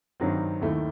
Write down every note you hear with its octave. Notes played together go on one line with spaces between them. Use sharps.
G2 D#3 F#3 C4
D#2 D#3 A3 E4